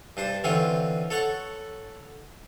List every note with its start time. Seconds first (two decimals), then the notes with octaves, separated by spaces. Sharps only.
0.17 G2 D4 C5
0.44 D3 E3 C4 F4 C#5
1.11 A4 C#5 F#5 C#6